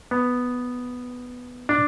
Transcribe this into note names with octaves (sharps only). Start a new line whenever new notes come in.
B3
D4